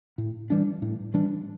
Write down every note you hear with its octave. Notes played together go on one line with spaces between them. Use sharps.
A2
E3 G3 D4
A2
E3 G3 D4